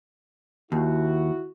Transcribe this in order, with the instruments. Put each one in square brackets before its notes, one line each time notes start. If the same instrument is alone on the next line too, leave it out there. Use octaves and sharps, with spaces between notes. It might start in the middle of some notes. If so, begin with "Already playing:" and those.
[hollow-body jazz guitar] D#2 [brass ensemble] E4 F#4